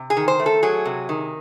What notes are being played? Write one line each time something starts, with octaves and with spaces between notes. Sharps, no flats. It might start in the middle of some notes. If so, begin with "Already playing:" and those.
Already playing: C3
G#4
D#3
C5
A3
A4
F#3 G#4
C3
D#3